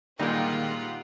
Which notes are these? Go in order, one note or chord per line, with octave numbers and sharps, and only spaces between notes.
A#2 D#3 G3 G#3 A#3 F4 G4 F#5